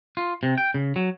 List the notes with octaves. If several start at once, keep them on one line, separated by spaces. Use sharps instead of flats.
F4
C3
G5
C#3
F#3